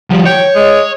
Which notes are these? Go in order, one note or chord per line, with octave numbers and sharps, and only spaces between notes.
F3 G3
C#5 G5
G#3